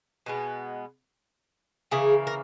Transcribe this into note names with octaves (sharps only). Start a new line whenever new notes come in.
B2 G#3 B3
C#3 E3 A#3 G#4
A#4